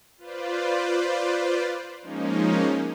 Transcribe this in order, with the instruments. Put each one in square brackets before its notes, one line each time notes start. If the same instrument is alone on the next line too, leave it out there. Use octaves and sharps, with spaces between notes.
[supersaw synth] F4 B4 C5 D5
F3 G#3 A#3 C#4 D#4